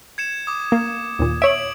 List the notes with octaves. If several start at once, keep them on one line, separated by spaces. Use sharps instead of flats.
G#6 C#7 E7
D6 D#6
A#3
D#2 A#2
C#5 E5 D7 F#7